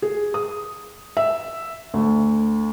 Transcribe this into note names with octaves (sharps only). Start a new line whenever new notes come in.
G#4
D#6
E5
D2